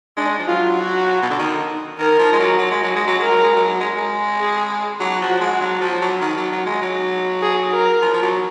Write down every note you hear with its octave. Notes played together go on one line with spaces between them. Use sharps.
G#3 D4
F3
F#3 F4
F#4
B2
D3
D#3
D#3 A#4
F3
G#3
F#3
F#3
G#3
F#3
G#3
F#3
G#3 A#4
F#3
G#3
F#3
G#3
G#3
G#4
F#3 F#4
F3
G#3
F#3
F3
F#3
D#3
F#3
F#3
G#3
F#3
G#4
A#4
F3
F3
F#3